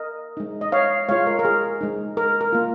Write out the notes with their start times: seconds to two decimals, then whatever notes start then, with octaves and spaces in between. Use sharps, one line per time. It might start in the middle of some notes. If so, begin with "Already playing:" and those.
Already playing: A#4 D#5
0.37 G#3 D#4
0.61 D#5
0.72 C#5 F5
1.09 G#3 F4 C#5 F5
1.27 A#4
1.39 A#4
1.45 G#4
1.81 G#3 D#4
2.17 A#4
2.41 A#4
2.52 A#3 F4